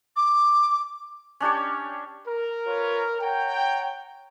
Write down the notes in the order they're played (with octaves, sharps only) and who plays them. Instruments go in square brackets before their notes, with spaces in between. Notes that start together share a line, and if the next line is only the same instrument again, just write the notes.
[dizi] D6
[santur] C#4 D4 G4 C#5
[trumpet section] A#4
[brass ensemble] F4 B4 C#5
[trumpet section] C#5 F#5 A#5 [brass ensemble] G5